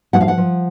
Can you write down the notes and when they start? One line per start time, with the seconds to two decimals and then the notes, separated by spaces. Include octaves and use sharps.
0.13 F3 F#5
0.21 F5
0.28 F#5
0.38 F3